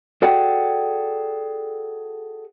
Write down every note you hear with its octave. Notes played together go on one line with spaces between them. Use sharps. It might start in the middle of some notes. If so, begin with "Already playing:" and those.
F#4 G#4 A4 D5 F#5 G5